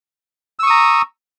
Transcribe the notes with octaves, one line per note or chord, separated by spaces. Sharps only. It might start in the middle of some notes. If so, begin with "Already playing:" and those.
A#5 C#6 D#6 E6